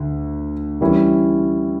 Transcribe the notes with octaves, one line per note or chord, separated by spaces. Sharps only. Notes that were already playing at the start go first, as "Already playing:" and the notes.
Already playing: D2 D3
E3 G3 C#4 E4